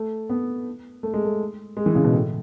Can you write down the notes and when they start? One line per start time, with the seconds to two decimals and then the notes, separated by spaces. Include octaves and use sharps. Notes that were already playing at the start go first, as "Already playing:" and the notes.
Already playing: A3
0.29 B3
1.03 A3
1.13 G#3
1.25 A3
1.77 G#3
1.86 E3
1.95 C#3
2.04 B2
2.13 A2